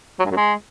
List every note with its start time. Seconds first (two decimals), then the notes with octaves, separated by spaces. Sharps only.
0.19 F#3
0.25 G2
0.31 F#2
0.37 G#3